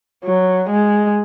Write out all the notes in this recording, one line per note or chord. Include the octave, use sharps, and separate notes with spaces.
F#3
G#3